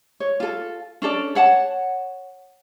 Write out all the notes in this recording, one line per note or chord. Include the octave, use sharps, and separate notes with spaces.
C#5
F4 A4
C#4 D4 A4 D5
C#5 F#5 A5